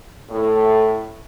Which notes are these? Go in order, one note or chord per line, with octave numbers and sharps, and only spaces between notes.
A2